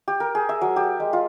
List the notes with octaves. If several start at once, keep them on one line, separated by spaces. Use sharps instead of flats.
G4
A#4
G#4
E5
F#3
G4
G#3
F4